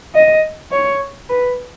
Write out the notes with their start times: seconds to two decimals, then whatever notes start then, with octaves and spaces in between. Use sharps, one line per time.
0.15 D#5
0.72 C#5
1.29 B4